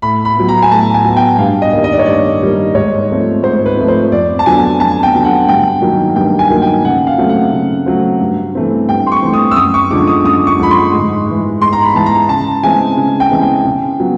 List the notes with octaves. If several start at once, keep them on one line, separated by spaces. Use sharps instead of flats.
A2 B5
B5
F#3 B3
A#5
G#5
A2 A5
G#5
F#3 B3
G5
G2 F5
D#5
D#3 G3 A#3
D#5
D5
C#5
G2 D5
D#3 G3 A#3
G#2 C#5
F3 A3 C4
G#2 C5
B4
F3 A3 C4
C5
F2 D5
A5
D3 F#3 B3 G#5
F2 A5
G5
D3 F#3 B3
F#5
G2 G5
D#3 F#3 A#3
G2 G5
G#5
D#3 F#3 A#3
G5
C#3 F#5
F5
F#3 A3 C4
F#5
C#3
F#3 A3 C4
G2
E3 A3 C4
G2 G5
C6
C#6
E3 A3 C4
D#6
E6
F#2 D#6
C#6
D3 F3 G#3 D6
D#6
F#2 D#6
C#6
D3 F3 G#3 B5
C6
G#2
E3 G#3
G#2 C6
A#5
B5
E3 G#3 A5
A#5
C#3 A5
E3 G#3 C4 G#5
C#3
G5
E3 G#3 C4
G5
C#3
F#3 B3